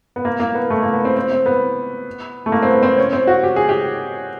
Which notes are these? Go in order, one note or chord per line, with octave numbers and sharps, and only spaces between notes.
B3
A#3
A#3
B3
A3
A#3
B3
C4
C4
C4
B3
A3
A#3
C4
B3
C4
C#4
C4
F#4
G4
G#4
G4